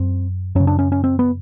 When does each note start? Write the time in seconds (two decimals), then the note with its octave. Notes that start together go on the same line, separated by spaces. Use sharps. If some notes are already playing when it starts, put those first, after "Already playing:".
Already playing: F#2 C4
0.55 F#2 C#4
0.60 C#3
0.67 D4
0.79 C#4
0.92 C#4
1.04 C4
1.19 B3